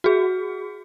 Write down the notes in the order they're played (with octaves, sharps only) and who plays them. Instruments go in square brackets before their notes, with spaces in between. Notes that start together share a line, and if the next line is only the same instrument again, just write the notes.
[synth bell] F#4 G#4